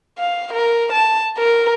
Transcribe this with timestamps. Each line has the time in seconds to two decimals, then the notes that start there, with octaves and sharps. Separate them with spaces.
0.18 F5
0.54 A#4
0.92 A5
1.37 A#4